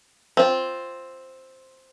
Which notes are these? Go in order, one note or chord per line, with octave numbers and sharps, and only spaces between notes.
C4 F4